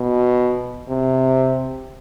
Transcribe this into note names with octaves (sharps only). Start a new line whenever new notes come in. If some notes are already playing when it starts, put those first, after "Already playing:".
Already playing: B2
C3